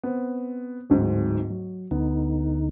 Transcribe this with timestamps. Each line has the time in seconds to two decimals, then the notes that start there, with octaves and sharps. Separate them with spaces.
0.03 B3 C4
0.90 D1 G#2 C4
1.50 F#3
1.91 D2 D3 B3 D#4